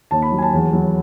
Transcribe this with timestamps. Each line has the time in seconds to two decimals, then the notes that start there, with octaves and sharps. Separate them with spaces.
0.11 D#2 A5
0.22 B5
0.32 F#3
0.38 G#5
0.42 A5
0.53 E2
0.73 F#3